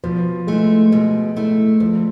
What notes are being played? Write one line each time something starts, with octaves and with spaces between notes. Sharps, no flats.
B2 F3
G#3 A3 E4
B2 G#3
A3 E4
D2 F3